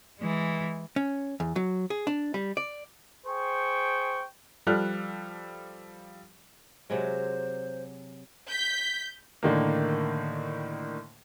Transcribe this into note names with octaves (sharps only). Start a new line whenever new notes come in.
E3 G#3
C#4
E2
F#3
G#4
D4
G3
D5
G#4 C5 G5 C#6
F3 G3 A4 F6 F#6
C3 F#3 G#3 C5
G6 B6
A2 D3 D#3 A#3